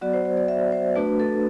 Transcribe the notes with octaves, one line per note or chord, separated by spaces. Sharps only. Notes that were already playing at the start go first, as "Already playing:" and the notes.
F#3 B3 F#4 D5
C5
C5
D5
E5
C5
A3 D4 F#4 B4
A4